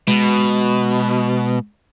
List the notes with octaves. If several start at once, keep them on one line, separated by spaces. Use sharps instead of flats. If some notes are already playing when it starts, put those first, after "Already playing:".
B2 G#3